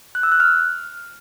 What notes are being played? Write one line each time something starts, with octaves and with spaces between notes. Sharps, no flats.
F#6
E6
F#6
F6